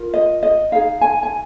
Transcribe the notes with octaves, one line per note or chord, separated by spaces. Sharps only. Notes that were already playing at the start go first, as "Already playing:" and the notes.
Already playing: F4 A#4
D#5
D#5
D#4 G#4 F5
G#5
G#5